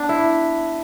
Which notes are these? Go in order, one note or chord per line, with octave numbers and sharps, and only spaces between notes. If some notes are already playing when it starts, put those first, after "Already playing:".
Already playing: B3 D4
E4